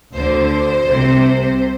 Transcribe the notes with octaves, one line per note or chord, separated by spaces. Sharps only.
D2 D3 C5
C2 C3